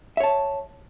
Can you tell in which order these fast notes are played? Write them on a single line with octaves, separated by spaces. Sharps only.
E5 C#5 A5